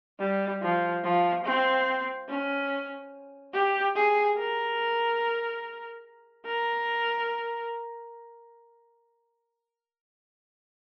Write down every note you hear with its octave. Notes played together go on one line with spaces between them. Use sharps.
G3
F3
F3
C4
C#4
G4
G#4
A#4
A#4